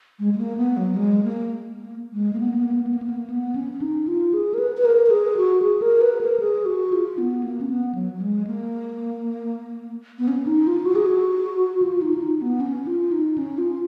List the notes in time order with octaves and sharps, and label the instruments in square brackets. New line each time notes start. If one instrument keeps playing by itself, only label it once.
[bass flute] G#3
G#3
A#3
B3
F#3
G#3
A#3
A#3
G#3
A#3
B3
A#3
B3
A#3
B3
A#3
B3
A#3
B3
A#3
B3
C#4
C#4
D#4
F4
G#4
A#4
B4
B4
A#4
A#4
G#4
F#4
G#4
A#4
B4
A#4
G#4
F#4
F4
B3
A#3
C#4
B3
F#3
F#3
G#3
A#3
B3
C#4
D#4
F4
F#4
G#4
F#4
F4
D#4
F4
D#4
B3
C#4
F4
D#4
C#4
F4